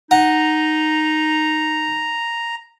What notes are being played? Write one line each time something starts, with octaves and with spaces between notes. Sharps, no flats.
D#4 F#5 A#5